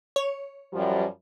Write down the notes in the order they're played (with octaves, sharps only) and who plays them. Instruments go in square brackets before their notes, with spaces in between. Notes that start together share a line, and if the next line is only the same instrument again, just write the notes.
[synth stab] C#5
[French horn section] F#2 F3 G3